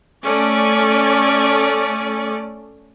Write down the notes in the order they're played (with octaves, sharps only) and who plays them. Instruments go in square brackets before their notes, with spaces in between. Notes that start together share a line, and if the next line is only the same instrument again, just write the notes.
[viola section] A3 C#4 D5